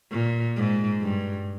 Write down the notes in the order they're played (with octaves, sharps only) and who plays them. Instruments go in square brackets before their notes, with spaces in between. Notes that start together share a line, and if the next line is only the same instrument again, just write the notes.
[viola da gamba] A#2
G#2
G2